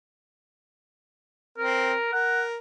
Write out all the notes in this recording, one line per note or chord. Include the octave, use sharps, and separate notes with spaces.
C4 A#4
A#4 F#5